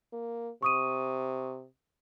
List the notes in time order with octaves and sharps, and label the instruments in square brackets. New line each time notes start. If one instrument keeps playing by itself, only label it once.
[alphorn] A#3
[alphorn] C3 [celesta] C#6 D#6 D#7